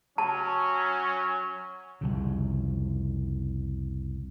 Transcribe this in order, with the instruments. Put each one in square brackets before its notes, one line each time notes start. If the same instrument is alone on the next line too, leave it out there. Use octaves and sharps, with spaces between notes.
[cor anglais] F#3 [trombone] C#4 [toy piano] A5
[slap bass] C2 F2 C#3